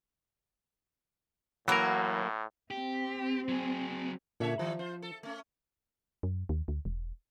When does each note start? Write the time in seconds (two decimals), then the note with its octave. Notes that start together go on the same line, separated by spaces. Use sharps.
1.68 A2 E3 F#3 A#3 F#4 A#4
2.71 C4 G4
3.48 F#3 G#4
4.40 A#2 D3 C#4 D4 C#5 E5
4.59 A2 D#3 F3 G3
4.79 F4 C5
5.02 A4
5.23 A3 C#4
6.23 F#2
6.49 D#2
6.68 D2
6.85 E1